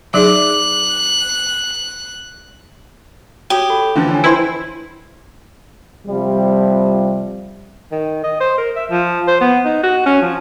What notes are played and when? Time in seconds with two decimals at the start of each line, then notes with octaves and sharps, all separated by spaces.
0.14 F#3 D#4 G#4 D5 F#6
3.50 F#4 G4 C#5 D#6
3.70 A4 B5
3.96 D3 E3 F3 E4 F4 C6
4.10 C#5 G#5
4.24 E4 B4 C5
6.07 C3 F3 G3
7.92 D#3
8.24 D#5
8.40 C5
8.58 A#4
8.76 E5
8.90 F3
9.28 C5
9.41 B3
9.65 D#4
9.83 F#4
10.06 C#4
10.22 F3